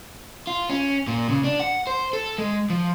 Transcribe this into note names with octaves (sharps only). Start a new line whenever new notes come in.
F4
C#4
A#2
C#3
D4
F#5
C5
A4
G#3
F3